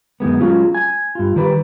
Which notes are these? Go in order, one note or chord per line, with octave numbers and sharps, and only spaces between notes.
F#2 D#3 G#3 B3
F#3 G#3 C#4 F4
G#5
G2 F4
D#3 G3 B4